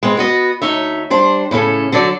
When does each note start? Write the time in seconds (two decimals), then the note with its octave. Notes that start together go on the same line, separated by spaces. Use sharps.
0.03 G#3 B3 C4
0.17 B3 F#4 D#5
0.62 D2 D#4 C#5 E5
1.10 G3 D4 C5
1.51 A2 C#3 C#4 A4
1.92 D3 F#3 A4 D5